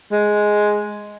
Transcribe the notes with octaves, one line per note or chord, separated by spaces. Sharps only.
G#3